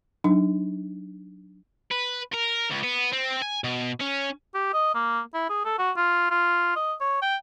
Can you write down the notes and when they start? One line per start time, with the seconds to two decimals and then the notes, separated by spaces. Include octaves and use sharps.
0.24 F#3 D4 D#4
1.91 B4
2.33 A#4
2.70 C#2
2.83 B3
3.12 C4
3.42 G#5
3.64 B2
4.01 C#4
4.54 G4
4.73 D#5
4.95 A#3
5.34 E4
5.49 G#4
5.65 A4
5.78 F#4
5.96 F4
6.30 F4
6.76 D#5
7.00 C#5
7.22 G5